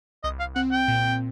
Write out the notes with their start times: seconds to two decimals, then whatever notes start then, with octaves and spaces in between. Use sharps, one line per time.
0.24 C2 D#5
0.39 F5
0.56 C4 F#5
0.72 G5
0.88 A#2